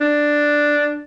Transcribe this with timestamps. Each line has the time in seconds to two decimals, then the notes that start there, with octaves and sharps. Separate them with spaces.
0.01 D4